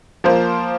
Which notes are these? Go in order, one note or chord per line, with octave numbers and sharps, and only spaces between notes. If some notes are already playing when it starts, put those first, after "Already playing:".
F3 A#3 F4 C5